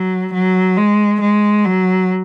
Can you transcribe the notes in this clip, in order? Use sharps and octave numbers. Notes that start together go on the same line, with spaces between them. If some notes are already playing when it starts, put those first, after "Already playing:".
Already playing: F#3
F#3
G#3
G#3
F#3